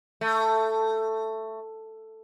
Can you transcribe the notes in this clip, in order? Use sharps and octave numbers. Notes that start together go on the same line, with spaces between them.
A3